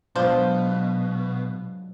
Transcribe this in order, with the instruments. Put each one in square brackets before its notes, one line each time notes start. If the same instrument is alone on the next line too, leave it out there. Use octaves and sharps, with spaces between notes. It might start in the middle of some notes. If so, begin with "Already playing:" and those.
[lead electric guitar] B2 [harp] F#3 G#3 B4 [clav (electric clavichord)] D4 F4 [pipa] C5